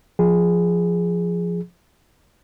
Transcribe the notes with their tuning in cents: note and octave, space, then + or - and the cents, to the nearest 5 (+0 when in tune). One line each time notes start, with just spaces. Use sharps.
F3 +0 G#4 +0